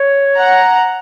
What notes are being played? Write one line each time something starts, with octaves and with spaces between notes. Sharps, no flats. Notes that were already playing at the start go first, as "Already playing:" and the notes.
Already playing: C#5
F#5 A#5